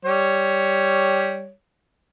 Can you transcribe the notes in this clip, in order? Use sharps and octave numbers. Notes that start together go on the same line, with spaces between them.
G3 C#5